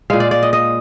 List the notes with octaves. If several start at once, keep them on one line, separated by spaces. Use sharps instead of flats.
A#2 G#3 F5
D5
D5
D#5
D#5